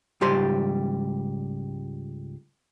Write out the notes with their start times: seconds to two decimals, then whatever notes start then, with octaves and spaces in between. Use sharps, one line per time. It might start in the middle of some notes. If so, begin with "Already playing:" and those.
0.21 C#2 G#2 G3 G4 C5 C6